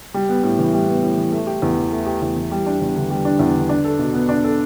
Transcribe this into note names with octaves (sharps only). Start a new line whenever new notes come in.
G3
B3
A2
E3
G3
B3
A2
E3
A3
G4
E2
E3
A3
G4
E2
E3
G3
D4
E2
D3
G3
D4
E2
D3
D4
A4
B2
B3
D4
A4